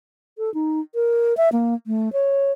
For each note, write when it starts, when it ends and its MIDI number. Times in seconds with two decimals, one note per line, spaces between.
0.38 0.53 69
0.54 0.80 63
0.95 1.36 70
1.37 1.49 76
1.52 1.75 58
1.87 2.12 57
2.13 2.52 73